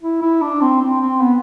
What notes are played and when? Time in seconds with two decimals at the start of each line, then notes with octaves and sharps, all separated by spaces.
0.02 E4
0.22 E4
0.42 D4
0.61 C4
0.82 C4
1.01 C4
1.21 B3